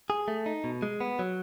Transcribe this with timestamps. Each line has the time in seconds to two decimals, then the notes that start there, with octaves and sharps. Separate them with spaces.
0.10 G#4
0.28 A3
0.46 D#4
0.64 B2
0.82 G#3
1.01 B3
1.19 F#3